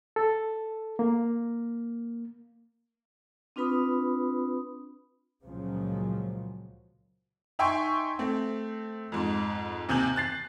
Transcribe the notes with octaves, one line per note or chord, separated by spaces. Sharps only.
A4
A#3
C4 D4 F4 B4 B5 D#6
C#2 A#2 C#3 F3 F#3
D#4 E5 G5 G#5 C6 C#6
A3 C4
F2 G#2
D#2 C3 G#5 G6 F#7
F#6 A6 C7